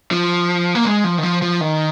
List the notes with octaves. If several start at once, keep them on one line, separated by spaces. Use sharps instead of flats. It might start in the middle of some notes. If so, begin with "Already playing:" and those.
F3
A#3
G#3
F3
D#3
F3
F3
D#3